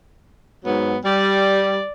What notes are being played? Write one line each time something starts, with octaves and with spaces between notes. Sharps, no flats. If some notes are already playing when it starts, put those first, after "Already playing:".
G#2 F#3 B3
G3 D5